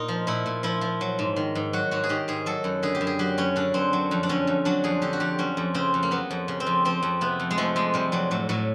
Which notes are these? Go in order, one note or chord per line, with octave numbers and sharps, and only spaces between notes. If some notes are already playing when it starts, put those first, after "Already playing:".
Already playing: A#2 D#4
F3
A#2 E4
A#2
F3 E4
F3
F#3
G#2
D#3
G#2
F#3 F#4
G#2 F#4
G#4
D#3 G4
G#2 G#4
F#3 A4
F#2
D3 G#4
G4
F#2
G#4
F#3 G4
F#2 C#4
D3 D4
F#2 C4
F#3
F2
D4
D3 C#4
F2
F#3 D4
F2 G#4
D3 G4
F#4
F2 G4
F#3 C#4
F2
C#3 C4
F2
A#3
F#3 B3
F2
C#3
C4
F2
F3 C4
F2
C3 B3
F2
G#3
F3 A3
F2 G#3
C3 G3
F2 F#3
A2 F#3
A2 F#3